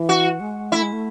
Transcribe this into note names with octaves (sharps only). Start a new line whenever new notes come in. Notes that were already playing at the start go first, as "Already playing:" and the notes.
Already playing: E3
F#4
G#3
A3 E4
G#3
A3